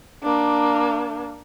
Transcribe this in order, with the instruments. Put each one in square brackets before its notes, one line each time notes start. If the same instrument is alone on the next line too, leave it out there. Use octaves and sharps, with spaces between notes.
[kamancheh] A#3 D4